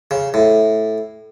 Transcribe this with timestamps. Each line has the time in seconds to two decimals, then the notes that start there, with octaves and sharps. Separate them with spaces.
0.11 C#3
0.34 A2